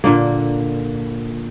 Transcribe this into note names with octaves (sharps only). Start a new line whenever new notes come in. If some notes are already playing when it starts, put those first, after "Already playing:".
A#2 D3 A#3